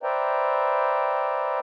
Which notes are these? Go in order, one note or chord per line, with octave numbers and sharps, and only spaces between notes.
B4 C5 D5 E5 G5 A#5